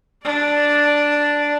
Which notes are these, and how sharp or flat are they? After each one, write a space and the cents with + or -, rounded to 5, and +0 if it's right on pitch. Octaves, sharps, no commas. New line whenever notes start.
D4 +0 D5 +0